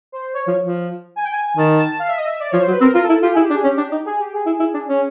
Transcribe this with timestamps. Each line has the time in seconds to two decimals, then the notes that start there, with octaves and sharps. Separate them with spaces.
0.12 C5
0.34 C#5
0.47 F3
0.61 F3
1.16 G#5
1.23 G5
1.31 G#5
1.57 D#3 A5
1.78 A5
1.99 F5
2.08 E5
2.17 D#5
2.25 E5
2.40 D5
2.50 F3 C#5
2.60 C5
2.68 F#3
2.71 B4
2.81 C4 A#4
2.95 F4 A#4
3.02 A4
3.09 E4
3.22 F4 G4
3.33 E4 G#4
3.43 G4
3.50 D4
3.54 G#4
3.64 C#4 G4
3.78 D4
3.84 G4
3.92 D#4
3.96 G4
4.05 G#4
4.19 G4
4.33 G#4
4.46 E4
4.60 E4
4.74 D4
4.88 C#4